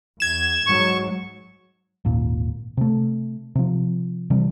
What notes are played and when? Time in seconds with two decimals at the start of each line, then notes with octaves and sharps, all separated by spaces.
0.20 E2 G#6 E7
0.67 G#2 F#3 G#3 C#6
2.05 G#1 D#2 A#2
2.77 C3 A3
3.55 C3 F3
4.30 C3 E3 G3